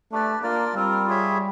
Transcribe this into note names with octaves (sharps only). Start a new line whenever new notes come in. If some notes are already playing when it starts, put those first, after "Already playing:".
A3 D4 G4 B4 D5
A#3 D4 F4 A#4 D5
G3 C4 F4 A#4
F4 G#4 C#5 E5